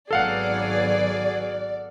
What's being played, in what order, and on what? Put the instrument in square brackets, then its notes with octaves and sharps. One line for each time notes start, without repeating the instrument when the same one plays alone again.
[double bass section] G#1 F#3 B3 [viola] G#4 [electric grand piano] A4 F5 F#5 [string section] D5